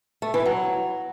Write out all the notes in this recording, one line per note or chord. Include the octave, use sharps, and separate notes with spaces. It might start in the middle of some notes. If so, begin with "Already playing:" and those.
A3
E3
F#3